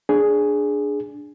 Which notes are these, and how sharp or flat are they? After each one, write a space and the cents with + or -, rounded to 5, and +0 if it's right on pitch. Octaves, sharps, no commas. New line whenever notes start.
D4 +0 G#4 +0